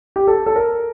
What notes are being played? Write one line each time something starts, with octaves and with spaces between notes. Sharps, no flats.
G4
A4
A4
A#4